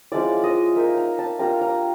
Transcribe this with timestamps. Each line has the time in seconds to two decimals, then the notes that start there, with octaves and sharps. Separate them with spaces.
0.12 F3 G#3 C#4 E4 D5
0.44 D#5
0.76 A#3 D#4 E5
0.97 A#5
1.19 A5
1.39 G3 A#3 D4 F4 A#5
1.61 A#5